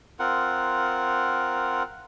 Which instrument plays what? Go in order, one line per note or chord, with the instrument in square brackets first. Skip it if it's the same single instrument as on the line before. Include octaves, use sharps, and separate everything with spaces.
[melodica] C4 F4 A#4 F#5